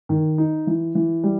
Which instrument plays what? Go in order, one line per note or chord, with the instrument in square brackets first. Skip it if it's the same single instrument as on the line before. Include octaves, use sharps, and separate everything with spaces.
[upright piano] D#3
D#4
E3
E3
G3